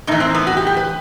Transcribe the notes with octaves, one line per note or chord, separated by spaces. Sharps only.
A2 E3 D#4
C4
B3
F#4
G4
G4
B4